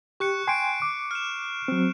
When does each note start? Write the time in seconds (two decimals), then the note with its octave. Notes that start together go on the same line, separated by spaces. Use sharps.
0.20 G4 C#6 F#6 C#7
0.47 G5 G#5 C6 C7 D7
0.82 D6
1.11 F6 E7
1.68 F#3 C4